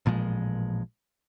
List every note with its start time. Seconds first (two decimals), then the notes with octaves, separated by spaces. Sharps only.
0.06 A1 A#2 F3 G#3